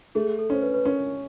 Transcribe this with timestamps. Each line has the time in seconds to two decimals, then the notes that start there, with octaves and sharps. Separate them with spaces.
0.15 A3 G#4
0.39 A4
0.50 C#4 C5
0.62 B4
0.74 B4
0.85 C#4 A#4